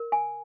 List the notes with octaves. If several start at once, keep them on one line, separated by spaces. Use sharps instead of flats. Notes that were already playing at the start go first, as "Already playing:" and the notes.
Already playing: A#4
G#5